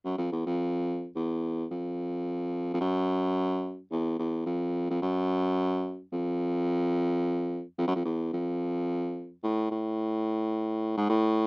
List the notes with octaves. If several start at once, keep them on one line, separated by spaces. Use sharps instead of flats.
F#2
F2
E2
F2
E2
F2
F2
F#2
E2
E2
F2
F2
F#2
F2
F2
F#2
F2
E2
F2
A2
A2
G#2
A2